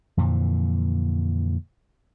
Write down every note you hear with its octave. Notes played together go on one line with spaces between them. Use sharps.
F2 A#2 D3 E3